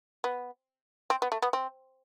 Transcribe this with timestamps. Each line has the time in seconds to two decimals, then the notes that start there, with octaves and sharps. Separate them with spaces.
0.24 B3
1.10 C4
1.22 B3
1.32 A3
1.42 B3
1.53 C4